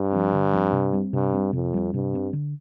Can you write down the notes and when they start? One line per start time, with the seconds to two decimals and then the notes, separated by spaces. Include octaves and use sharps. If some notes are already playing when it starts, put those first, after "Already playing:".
Already playing: G2
0.13 F3 C4
0.33 D3
0.53 F3 C4
0.73 C3
0.93 G3 C4
1.13 G2 C3
1.34 G3 C4
1.53 F2 C3
1.74 G3 C4
1.93 G2 C3
2.13 G3 C4
2.33 D3